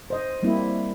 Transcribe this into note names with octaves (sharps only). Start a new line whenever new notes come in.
C5 D#5
G3 A#3 C4 E4